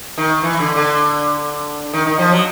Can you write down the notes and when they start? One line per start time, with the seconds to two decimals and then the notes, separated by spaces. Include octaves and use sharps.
0.18 D#3
0.43 E3
0.60 D3
0.76 D3
1.93 D#3
2.06 D#3
2.19 F3
2.32 F#3